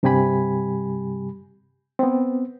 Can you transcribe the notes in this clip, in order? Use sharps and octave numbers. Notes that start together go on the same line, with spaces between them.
G2 C3 G3 G4 G#5 B5
B3 C4